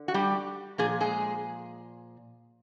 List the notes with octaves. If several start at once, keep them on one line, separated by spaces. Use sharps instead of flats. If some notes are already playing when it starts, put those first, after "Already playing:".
Already playing: D3
F#4
G3 G4
A#2 F3 G#4
G#3 G#4